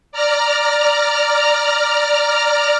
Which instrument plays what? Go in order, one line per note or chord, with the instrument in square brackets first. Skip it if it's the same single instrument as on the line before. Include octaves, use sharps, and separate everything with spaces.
[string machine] D5 A#5 F6